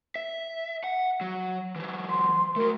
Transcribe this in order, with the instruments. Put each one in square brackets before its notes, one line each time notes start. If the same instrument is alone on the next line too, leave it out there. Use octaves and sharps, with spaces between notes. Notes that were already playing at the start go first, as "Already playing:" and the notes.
[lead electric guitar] E5
F#5
F#3
E3 F#3
[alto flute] C6
[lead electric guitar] A3 F#4 [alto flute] A#4